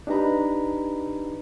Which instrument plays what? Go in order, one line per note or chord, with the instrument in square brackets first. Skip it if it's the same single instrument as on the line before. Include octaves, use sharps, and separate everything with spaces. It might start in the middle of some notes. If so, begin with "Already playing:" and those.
[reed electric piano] D4 D#4 G4 B4 A#5 B5